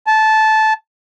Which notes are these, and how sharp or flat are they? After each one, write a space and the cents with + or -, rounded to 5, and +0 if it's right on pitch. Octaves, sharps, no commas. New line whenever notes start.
A5 -15